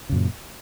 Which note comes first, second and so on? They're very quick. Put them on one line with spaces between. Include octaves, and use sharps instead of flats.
C#3 F#2 A#2